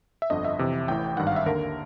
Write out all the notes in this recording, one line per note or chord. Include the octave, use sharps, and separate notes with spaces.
E5
G1 F2 D3 D#5
E5
F2 C3 E3
A1 A2 E3 G5
G#1 G2 D#3 F#5
F5
E5
D#2 D3 A#4